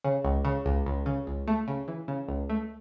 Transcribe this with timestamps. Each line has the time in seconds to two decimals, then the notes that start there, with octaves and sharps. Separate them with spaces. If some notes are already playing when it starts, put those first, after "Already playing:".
0.04 C#3
0.25 C#2
0.45 C#3
0.66 C#2
0.86 C#2
1.06 C#3
1.27 C#2
1.48 A3
1.68 C#3
1.88 E3
2.08 C#3
2.29 C#2
2.50 A3